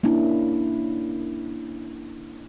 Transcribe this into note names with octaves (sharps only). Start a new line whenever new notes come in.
A#3 C#4 D4 E4